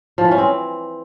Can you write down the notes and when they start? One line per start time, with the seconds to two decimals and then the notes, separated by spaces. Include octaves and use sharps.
0.18 F3
0.25 E3
0.31 C#4
0.38 C4